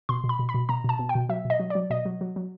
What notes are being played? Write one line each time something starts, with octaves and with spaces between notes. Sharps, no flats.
B2 C6
B2
B5
B2
B5
B2
B2 A#5
B2 A5
B2
G5
B2
F#3 E5
B2
D#5
F#3
F#3 D5
B2 D#5
F#3
F#3
F#3